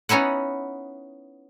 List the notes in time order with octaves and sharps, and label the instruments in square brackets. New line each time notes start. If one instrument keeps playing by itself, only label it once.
[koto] B3 C#4 D#4 E4 F#5